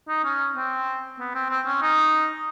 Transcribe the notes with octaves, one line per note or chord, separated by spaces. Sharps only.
D#4
C#4
C4
B3
C4
C4
C#4
D#4